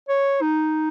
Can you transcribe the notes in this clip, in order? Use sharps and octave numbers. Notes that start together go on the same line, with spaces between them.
C#5
D#4